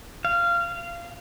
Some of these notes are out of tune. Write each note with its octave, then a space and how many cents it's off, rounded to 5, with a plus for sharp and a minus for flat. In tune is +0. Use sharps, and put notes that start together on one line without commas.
F5 -20